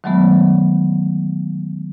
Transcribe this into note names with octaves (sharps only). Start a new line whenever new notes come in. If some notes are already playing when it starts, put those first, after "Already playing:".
D#3 E3 F#3 G#3 A3 B3